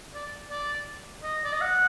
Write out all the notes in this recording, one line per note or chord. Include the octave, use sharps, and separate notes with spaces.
D5
D5
D#5
D5
D#5
F#5